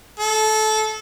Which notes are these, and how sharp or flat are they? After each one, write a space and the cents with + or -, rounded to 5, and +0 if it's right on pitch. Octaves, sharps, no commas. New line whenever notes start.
A4 -20